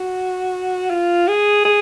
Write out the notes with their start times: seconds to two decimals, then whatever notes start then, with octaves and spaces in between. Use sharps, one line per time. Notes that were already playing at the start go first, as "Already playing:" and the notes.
Already playing: F#4
0.90 F4
1.28 G#4
1.65 G#4